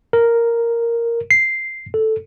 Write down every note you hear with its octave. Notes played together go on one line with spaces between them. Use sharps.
A#4
C7
A4